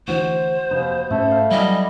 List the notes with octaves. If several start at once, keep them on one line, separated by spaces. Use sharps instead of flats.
D2 E3 F#4 C5
F1 D#2 D#4 B4
G#2 A3 C#4 A4
F5
E3 F#3 G3 B3 D#5 G#5